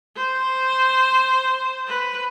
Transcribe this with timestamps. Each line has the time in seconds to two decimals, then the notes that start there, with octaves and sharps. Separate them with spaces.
0.17 C5
1.87 B4